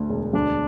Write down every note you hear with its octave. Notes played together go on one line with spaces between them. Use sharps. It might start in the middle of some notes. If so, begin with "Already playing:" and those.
Already playing: D2 D3 A3
E1
D2 D4